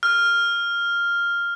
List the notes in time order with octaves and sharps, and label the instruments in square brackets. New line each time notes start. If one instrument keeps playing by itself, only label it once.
[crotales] F6